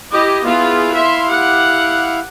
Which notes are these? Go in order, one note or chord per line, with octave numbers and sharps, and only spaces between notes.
E4 G4 D#5
B3 E4 F4 G#4 F5
E5 C6
G4 F#5